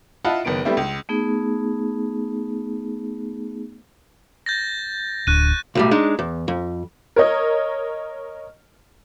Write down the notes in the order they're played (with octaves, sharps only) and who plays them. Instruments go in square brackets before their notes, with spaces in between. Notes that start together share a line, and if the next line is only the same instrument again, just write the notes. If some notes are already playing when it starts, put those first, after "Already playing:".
[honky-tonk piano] E4 F4 D#5 F#5 A5 B5
F#1 D#3 B3 D7
G3 A3 B3 C4 E4 G4
C#2
[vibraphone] A3 B3 D#4 G#4
[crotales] G6 A6 A#6
[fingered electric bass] D1 D4 [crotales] C#6 F#6 D#7
[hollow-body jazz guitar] B1 A2 G3
G#3 D4 D#4
E2
F2
[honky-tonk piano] A#4 C#5 D#5